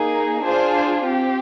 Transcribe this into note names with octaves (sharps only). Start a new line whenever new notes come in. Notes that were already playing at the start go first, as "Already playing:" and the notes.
Already playing: A#3 D#4 G#4
D4 F4 G#4 C5
C4 G4